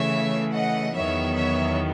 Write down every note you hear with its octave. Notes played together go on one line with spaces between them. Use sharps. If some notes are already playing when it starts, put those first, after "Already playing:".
Already playing: C#3 E3 A3 C#5 E5
D#5 F#5
E2 D#3 F#3 B3 C#5 E5
C#5 E5